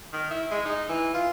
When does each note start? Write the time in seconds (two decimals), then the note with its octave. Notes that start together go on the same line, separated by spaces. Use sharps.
0.13 D#3
0.31 E4
0.51 G#3
0.66 D#4
0.89 E3
1.14 F4